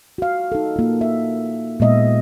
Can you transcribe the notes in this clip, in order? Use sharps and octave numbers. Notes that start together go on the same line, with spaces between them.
F#4 F5
D#4 A4
A#3 F4
E5
A#2 G#3 B3 D#5 E5